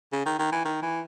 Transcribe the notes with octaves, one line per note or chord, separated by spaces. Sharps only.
C#3
D#3
D#3
E3
D#3
E3